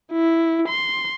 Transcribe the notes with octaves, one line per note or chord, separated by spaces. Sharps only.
E4
C6